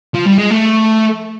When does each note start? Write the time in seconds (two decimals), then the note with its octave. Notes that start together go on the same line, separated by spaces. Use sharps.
0.14 F3
0.26 G3
0.38 G#3
0.50 A3